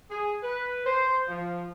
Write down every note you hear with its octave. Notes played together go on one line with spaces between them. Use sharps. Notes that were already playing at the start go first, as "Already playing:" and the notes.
G#4
B4
C5
F3